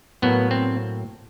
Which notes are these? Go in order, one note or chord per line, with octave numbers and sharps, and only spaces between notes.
A2 F#3 A#3 B3
C4